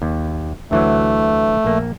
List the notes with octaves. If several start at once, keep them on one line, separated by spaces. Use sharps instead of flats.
D#2
D2 E3 F#3 A3
A#1 A#3